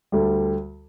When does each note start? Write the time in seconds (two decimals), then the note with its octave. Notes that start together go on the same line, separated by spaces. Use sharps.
0.12 D2 D3 G3